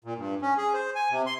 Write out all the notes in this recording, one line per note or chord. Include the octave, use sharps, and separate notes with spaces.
A#2
G2
C#4
G#4
C5
G#5
C3
C6